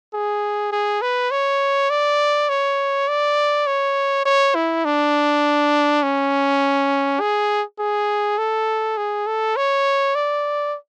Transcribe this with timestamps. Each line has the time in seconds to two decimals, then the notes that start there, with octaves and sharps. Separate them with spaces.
0.14 G#4
0.72 G#4
1.02 B4
1.31 C#5
1.90 D5
2.49 C#5
3.08 D5
3.67 C#5
4.25 C#5
4.55 E4
4.85 D4
6.03 C#4
7.20 G#4
7.79 G#4
8.38 A4
8.97 G#4
9.27 A4
9.56 C#5
10.15 D5